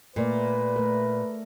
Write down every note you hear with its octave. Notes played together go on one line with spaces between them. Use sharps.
A#2 A3 A#4 B4 D5
A3 A#4